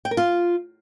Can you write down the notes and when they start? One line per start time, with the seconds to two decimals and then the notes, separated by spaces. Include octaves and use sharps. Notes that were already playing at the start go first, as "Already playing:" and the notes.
0.05 G5
0.11 A#4
0.17 F4